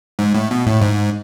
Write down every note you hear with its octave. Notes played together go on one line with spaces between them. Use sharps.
G#2
A2
B2
A2
G#2